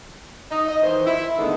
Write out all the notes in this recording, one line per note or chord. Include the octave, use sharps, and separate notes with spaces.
D#4
D#5
D#3 E3 C5
E4
D3 D#3 G#3 A3 B3 D#4